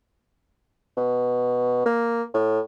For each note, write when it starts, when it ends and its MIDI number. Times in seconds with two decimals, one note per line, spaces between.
0.97 1.83 47
1.86 2.23 58
2.34 2.60 45